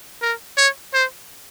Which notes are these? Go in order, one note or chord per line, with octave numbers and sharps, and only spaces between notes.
A#4
C#5
C5